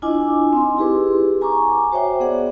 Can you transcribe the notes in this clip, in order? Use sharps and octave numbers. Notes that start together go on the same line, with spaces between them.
D4 E4 F4 D#5 G#5 D6
C4 D#4 C6
E4 G4 G#4 B4
G#5 A#5 C#6 D6
F#4 C5 C#5 E5 G5
B3 G#4 D5 F#5